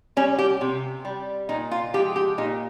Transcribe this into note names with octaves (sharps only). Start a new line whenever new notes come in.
G3 C#4
G4
C3
G3
A#2 D#4
F4
F3 G#3 G4
G4
A#2 D#4